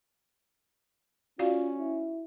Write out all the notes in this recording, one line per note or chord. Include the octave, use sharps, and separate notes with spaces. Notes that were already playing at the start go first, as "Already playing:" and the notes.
C#4 F4 F#4 D5 F5
E4